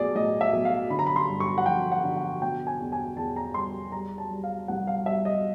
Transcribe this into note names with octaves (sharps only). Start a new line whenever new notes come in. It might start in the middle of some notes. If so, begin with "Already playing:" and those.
Already playing: B1 A2 G#4 D5
A2 D#5
E5
B1
F5
D3 B5
A#5
B5
C6
G2
C#6
F#5
F3 G5
F#5
D3
F#5
B2 G5
G#5
E2
G#5
E2 A5
A#5
G3 C6
G3 A#5
A5
G3
F5
C2 F#5
F5
G3 E5
D#5